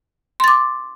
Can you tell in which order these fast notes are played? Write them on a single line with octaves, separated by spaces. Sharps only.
C6 A6 D6